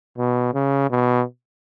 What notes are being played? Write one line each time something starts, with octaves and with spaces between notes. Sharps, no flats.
B2
C#3
B2